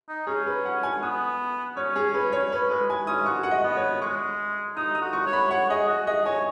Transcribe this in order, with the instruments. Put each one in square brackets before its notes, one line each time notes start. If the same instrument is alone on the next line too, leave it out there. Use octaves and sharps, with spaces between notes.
[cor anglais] D#4
[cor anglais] C#4 [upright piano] G#4
[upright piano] B4
F#5
G#5
[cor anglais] B3 [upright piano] D#6
[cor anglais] C#4 [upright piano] C#5
[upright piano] G#4
B4
C#5
[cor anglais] C#4 [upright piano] B4
[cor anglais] G#3 [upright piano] B4
[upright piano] G#5
[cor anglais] C#4 [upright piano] D#6
[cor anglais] F#4 [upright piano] C#6
[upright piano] F#5
D#5
[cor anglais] B3
[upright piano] C#5
[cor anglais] G#3 [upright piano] C#6
[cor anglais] D#4 [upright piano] D#6
[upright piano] D#6
[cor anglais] F#4
[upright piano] C#6
[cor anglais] C#5
[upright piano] B5
[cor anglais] C#5 [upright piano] F#5
[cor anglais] G#4 [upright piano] D#5
[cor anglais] F#4
[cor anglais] G#4 [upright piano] D#5
[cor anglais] C#5 [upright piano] G#5